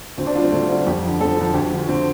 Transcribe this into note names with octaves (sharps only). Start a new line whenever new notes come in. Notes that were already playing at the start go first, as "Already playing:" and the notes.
D2 C4
D4
D3 G3 F4
C4
D2 A3
D3 G3
F2 G4
D3 F3
F2 A4
D3 F3
D2 G4
D3 F3
D2 C4